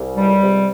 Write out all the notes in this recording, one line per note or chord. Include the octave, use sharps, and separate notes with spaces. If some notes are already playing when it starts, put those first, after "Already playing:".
Already playing: C2
C#2 G3
C3